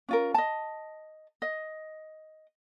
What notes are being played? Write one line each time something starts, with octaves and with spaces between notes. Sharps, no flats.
C#4 F4 A#4
D#5 A5
D#5